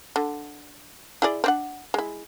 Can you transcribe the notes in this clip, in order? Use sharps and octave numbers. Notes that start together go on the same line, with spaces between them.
D3
E4 G#4 D5
C4 D4 F#5
G#3 E4